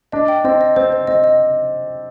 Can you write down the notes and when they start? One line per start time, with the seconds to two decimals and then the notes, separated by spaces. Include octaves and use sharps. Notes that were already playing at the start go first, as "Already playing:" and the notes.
0.12 D4 D#5
0.28 G5
0.44 C4 D#5
0.61 D#5
0.76 C4 C5
0.92 C5
1.07 C4 D#5
1.24 D#5